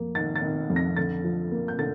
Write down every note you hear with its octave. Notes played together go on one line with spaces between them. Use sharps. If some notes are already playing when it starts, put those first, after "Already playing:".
Already playing: F2 A#3
D#3 A6
A6
D#3
F2
A#6
D3 A6
F3
A#3
G6
D3 A6